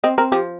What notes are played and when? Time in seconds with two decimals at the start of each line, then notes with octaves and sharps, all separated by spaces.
0.04 C4 D#5
0.18 C4 A#4
0.32 F3 G4